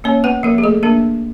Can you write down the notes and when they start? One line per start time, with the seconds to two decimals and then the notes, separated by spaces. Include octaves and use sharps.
0.04 A#3 C#4 C#5
0.24 B3 B4
0.43 F3 A#3 A#4
0.58 G#4
0.63 A3 A4
0.83 A#3 D4 A#4